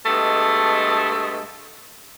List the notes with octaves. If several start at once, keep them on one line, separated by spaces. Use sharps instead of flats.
G2 B2 G#3 A3